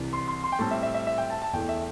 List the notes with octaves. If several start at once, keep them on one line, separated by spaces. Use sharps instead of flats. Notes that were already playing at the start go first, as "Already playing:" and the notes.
Already playing: C2 C3 E3
C6
C6
C6
G5
A2 G3 C4 A5
E5
E5
E5
E5
G5
A5
A5
E2 E3 A3 G5
E5